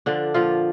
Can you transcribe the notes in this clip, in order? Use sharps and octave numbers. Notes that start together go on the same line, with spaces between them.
D3 F3 D4
A#2 F3 F4